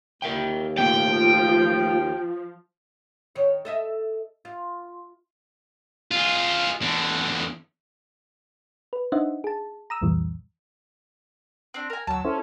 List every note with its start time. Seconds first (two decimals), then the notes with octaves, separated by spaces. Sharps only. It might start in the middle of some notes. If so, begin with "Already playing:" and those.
0.22 D#2 A#4 E5 G5
0.78 F3 A3 A#3 F4 G5
3.35 D#3 C#5
3.65 A4 D#5 E5
4.45 F4
6.11 F4 G#4
6.81 E2 D3
8.93 B4
9.12 D4 D#4 C5 D#5 E5 F#5
9.44 G#4 A5
9.90 A#5 D#6 E6
10.01 C2 F2 A#2 E3 G3
11.74 C4 D4
11.90 A#4 G#5
12.07 D2 F#3 A5 E6
12.25 C#4 E4 A4 C5